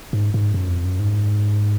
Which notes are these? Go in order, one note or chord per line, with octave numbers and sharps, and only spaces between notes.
G#2
G#2
F#2
F2
F#2
G#2